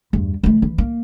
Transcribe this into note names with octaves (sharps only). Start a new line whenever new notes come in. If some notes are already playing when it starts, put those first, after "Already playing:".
E2 G2
E3 A3
E3
A#3